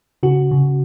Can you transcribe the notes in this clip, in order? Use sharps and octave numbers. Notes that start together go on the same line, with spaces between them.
C#3 F#4
C#3